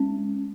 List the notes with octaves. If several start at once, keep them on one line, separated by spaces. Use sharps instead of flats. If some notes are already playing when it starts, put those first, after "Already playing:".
Already playing: G#3 C#4